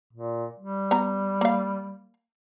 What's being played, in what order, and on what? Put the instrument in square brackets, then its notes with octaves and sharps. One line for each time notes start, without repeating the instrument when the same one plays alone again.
[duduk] A#2
G3
[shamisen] B3 A#5
A#3 F5